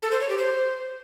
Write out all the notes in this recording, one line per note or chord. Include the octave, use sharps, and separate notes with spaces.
A4
C5
C#5
G4
C5